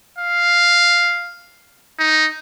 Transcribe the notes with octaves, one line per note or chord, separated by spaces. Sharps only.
F5
D#4